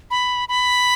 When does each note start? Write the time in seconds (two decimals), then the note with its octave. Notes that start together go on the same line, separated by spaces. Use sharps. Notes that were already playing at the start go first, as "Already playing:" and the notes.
0.11 B5
0.49 B5